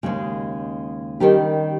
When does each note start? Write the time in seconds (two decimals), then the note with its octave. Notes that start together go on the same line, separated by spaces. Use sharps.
0.03 D#2 C#3 G#3 C#4
1.20 D#3 G3 C#4 G4 A#4